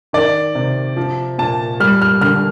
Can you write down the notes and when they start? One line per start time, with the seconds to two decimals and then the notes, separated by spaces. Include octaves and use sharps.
0.13 D#3 D5
0.55 C3
0.97 F3
1.38 A#2 A5
1.80 G3 F6
2.02 F6
2.21 D3 F6